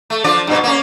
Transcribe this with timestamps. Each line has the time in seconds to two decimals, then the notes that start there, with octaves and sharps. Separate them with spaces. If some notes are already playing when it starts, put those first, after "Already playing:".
0.10 A3
0.24 F3 D4 D5
0.47 G2 B2
0.64 A#3 C#4